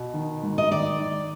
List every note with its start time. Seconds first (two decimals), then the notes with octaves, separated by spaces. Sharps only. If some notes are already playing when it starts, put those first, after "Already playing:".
Already playing: B2
0.14 D#3
0.43 G#2
0.58 D#5
0.72 D#3 D5
1.00 D#3